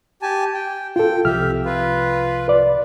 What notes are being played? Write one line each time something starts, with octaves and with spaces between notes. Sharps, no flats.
G4 G#5 A5
G5
F4 A4 G5
C2 C3 F3 G4 E5 F6
F4 B4
B4 D5